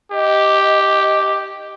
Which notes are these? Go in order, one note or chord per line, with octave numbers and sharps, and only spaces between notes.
G4 D#5